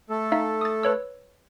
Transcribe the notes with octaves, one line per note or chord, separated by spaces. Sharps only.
A3 A4
D#4 E5 F5
D#6 A6
B4 C#5 E6